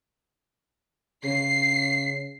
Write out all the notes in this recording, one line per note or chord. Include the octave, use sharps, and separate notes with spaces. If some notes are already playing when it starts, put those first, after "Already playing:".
C#3 C7